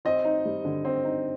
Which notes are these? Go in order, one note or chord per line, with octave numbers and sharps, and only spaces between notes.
C4 D#5
D#4
G3
D3
C4
D#4